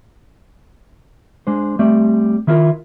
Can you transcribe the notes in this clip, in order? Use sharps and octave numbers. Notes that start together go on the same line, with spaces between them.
G#3 D4 C5
G3 A3 C4 G4 D5
D#3 E4 F4 G#4 A#4